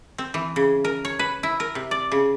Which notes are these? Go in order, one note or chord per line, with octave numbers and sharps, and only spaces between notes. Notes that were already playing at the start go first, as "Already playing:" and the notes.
C4
E3
C#3
A#4
C#5
B4
E4
A#4
C3
D5
C#3